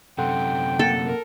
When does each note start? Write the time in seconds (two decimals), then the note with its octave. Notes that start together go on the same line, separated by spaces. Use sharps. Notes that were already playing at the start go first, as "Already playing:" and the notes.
0.18 F#2 C3 A4 F#5 G5 C6
0.79 A#3 A4 F#5
1.06 A#4